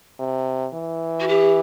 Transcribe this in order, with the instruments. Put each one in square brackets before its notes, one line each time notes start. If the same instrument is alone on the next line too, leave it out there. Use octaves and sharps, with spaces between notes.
[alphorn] C3
E3
[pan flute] F#4
G4